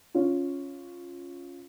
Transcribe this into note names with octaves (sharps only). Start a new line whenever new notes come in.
C#4 F4